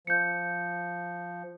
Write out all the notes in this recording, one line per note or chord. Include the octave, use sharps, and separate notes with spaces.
F3 G6 C#7